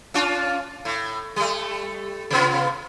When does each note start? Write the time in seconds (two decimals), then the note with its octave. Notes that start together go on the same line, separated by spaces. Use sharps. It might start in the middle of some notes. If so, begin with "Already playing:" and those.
0.14 C#4 D4 F4
0.85 A2
1.36 G3 A3
2.30 C3 B3 F4